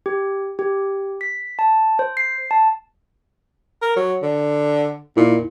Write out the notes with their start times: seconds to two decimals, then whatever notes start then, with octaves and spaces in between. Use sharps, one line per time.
0.06 G4
0.59 G4
1.21 B6
1.59 A5
1.99 C5
2.17 C7
2.51 A5
3.82 A#4
3.97 F#3
4.23 D3
5.17 A#2 D#4 E4